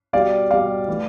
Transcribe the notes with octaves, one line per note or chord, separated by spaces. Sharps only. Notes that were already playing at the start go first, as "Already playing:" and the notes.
B2 G3 D5 F5
B2 G3 D5 F5
E3 A3